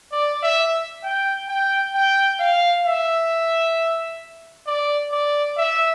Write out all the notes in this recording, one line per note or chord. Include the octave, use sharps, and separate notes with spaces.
D5
E5
G5
G5
G5
F5
E5
D5
D5
E5